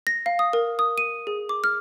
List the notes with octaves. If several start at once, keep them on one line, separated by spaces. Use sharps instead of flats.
A#6
F5
D#6
A#4
D#6
D#7
G#4
D6
F6